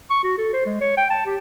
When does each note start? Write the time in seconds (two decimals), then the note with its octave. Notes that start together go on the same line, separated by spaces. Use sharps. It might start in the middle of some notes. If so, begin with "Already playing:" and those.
0.10 C#6
0.24 F#4
0.38 A4
0.53 C5
0.66 G#3
0.81 C#5
0.97 G5
1.10 A5
1.26 G4